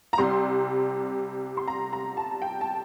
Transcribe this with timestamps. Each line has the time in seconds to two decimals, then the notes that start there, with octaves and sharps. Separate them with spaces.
0.13 A#5
0.18 C2 C3 G3 C6
1.57 C6
1.68 A#5
1.93 A#5
2.17 A5
2.42 G5
2.61 A5